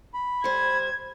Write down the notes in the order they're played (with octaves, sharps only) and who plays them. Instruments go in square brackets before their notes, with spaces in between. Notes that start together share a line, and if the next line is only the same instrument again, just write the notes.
[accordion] B5
[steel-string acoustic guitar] G3 C5 [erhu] G#6